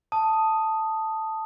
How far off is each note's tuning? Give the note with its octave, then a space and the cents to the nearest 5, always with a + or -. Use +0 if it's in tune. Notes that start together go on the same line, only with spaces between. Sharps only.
A5 +5 D#6 +0